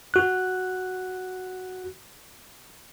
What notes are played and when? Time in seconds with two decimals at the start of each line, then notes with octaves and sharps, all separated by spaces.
0.14 F#4 F#6